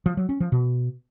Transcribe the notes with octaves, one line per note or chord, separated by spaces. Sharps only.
F3
F#3
C#4
F3
B2